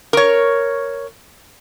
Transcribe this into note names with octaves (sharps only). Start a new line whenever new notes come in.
A#4 C#5